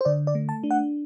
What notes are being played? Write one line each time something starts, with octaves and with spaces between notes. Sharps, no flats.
C5
D3 D5
D5
A3
A5
D4
F#5